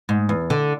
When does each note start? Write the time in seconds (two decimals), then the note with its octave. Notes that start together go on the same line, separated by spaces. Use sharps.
0.09 G#2
0.29 E2
0.50 D3